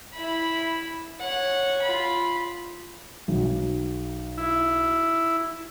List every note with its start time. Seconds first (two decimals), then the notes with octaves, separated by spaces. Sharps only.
0.13 E4 B5
1.20 C#5 F#5
1.82 F4 B5
3.28 B1
4.38 E4